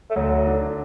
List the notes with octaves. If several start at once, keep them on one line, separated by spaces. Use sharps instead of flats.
A3
D2 F#3
D3 A3 D4 A4